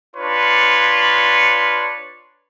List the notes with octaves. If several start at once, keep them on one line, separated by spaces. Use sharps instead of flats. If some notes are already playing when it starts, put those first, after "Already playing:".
D4 F4 B4 C#5 C6